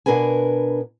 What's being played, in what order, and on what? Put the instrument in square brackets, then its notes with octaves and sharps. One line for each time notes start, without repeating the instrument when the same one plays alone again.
[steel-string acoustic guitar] B2 D4 A#4 B4 G#5